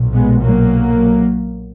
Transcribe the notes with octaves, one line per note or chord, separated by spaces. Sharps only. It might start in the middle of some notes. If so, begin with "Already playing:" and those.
Already playing: B1 A#2
G#3 B3
F#3 A#3